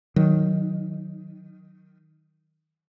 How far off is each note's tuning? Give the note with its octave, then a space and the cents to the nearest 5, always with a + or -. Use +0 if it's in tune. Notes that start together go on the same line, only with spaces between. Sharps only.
D#3 +0 F#3 +0